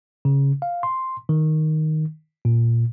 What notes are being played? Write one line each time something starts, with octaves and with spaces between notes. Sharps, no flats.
C#3
F5
C6
D#3
A#2